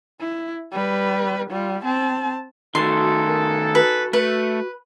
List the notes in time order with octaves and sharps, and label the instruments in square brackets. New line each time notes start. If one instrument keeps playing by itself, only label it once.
[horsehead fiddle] E4
G3 B4
G3 F4
C4 A5
[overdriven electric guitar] D#3 A3 [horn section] E3 D#4 A4 [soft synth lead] F#4 [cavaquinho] C6
[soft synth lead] A#4
[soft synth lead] F#4 [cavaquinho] B4
[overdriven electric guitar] A3 [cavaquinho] B4